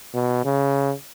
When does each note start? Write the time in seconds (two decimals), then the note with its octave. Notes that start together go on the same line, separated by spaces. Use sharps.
0.14 B2
0.44 C#3